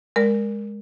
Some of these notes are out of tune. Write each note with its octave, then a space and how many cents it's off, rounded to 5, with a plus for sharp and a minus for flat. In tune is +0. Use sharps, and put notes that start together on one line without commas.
G#3 +0 A#4 +0 D5 +0